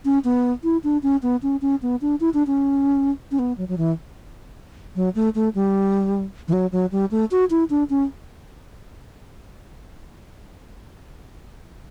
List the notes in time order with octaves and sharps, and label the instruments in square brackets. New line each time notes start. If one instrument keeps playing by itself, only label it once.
[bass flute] C#4
B3
E4
D4
C#4
B3
C#4
C#4
B3
D4
E4
D4
C#4
C#4
B3
F#3
F#3
E3
F#3
A3
A3
G3
E3
F#3
F#3
G3
A3
F#4
E4
D4
C#4